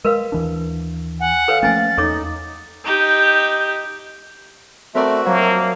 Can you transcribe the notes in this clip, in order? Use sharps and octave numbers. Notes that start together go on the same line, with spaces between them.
G#3 A#4 B4 F5
D#2 E3 D4
F#5 G#5
A4 B4 C#5 F5
F3 A3 A#3 C#4 G#5 A6
E2 D#4 A4 C#5 D6
D#4 G4
A3 C4 F#4 A#4 D5 E5
F3 F#3 A#3